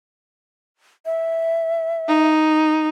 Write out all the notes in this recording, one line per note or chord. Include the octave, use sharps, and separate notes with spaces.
E5
D#4